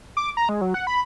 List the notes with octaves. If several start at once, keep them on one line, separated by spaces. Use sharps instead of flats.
D6
A#5
G#3
F#3
F#5
B5